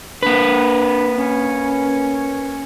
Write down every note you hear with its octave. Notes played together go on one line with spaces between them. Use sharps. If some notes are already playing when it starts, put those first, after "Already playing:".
A#3 D4 B4
C#4